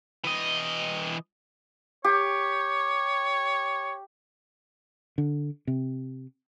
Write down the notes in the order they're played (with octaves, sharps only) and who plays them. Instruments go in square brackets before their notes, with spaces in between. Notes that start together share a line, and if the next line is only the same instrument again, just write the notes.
[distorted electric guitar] E3 D#5
[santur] G4 [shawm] C#5
[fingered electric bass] D3
C3